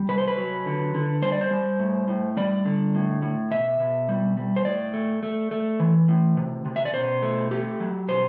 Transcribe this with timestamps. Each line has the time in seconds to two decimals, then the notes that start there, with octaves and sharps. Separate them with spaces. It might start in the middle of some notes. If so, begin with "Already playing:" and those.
Already playing: G3
0.09 C3 B4
0.18 C5
0.28 B4
0.37 F#3
0.66 D3
0.94 D3
1.22 G3 C5
1.32 D5
1.41 C5
1.51 G3
1.79 A2
2.08 A2
2.37 G3 D5
2.65 D3
2.95 A2
3.22 A2
3.51 B2 E5
3.80 B2
4.09 G3
4.37 G3
4.56 C5
4.65 A2 D5
4.93 A3
5.23 A3
5.51 A3
5.80 E3
6.08 A2
6.37 C3
6.66 C3
6.76 E5
6.85 D5
6.94 B2 C5
7.22 A3
7.51 A3 G4
7.80 F#3
8.08 B2 C5